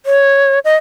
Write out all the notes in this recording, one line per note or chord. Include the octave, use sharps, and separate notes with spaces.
C#5
D#5